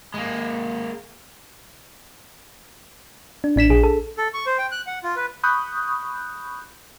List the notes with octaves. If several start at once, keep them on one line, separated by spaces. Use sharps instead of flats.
G#3 A#3
D4
A1 D4 B6 E7
A#1 G#4
A4
A4
C#6
C5
G5
F#6
F#5
F4
B4
B5 C#6 D#6 F#6 G6